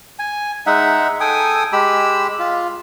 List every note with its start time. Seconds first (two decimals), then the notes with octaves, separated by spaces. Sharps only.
0.19 G#5
0.66 G#3 D#4 E5 F#5
1.20 A4 G5 G#5 D#6
1.73 G#3 G4 B5 E6
2.39 F4